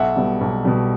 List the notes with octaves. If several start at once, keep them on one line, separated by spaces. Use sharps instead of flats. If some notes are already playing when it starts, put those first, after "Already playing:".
Already playing: B1 E5 F#5
B2 G3
B1
B2 G3